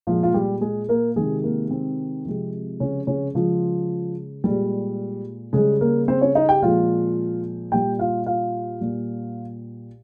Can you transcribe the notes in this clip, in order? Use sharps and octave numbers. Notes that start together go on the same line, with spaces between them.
A#2 F3 G#3 F4
F4
G3 G4
G#3 G#4
A#3 A#4
C3 D#3 G#3 G#4
A#3
C4
C3 F3 G#3
C#3 C#4
C#3 C#4
C#3 F3 G#3 F4
A#2 G3 G#3 G4
C#3 G3 G#3 G#4
A#3 A#4
C4 C5
C#4 C#5
D#4 D#5
G4 G5
A#2 F3 G#3 F4 F5
A#2 G3 G4 G5
F4 F5
F4 F5
A#2 G3